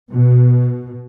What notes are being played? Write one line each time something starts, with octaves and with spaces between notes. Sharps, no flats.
B2